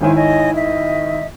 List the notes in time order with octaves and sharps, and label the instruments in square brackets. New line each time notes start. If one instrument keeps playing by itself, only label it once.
[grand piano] G#1 D#3 E4 [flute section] C5 C#5 G#5
[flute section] C#5 D#5 G#5
D#5 E5